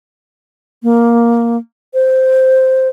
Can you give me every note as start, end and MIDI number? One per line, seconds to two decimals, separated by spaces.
0.83 1.57 58
1.94 2.88 72